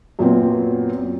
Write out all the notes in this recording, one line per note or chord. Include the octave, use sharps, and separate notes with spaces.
F#2 A#2 B3 C4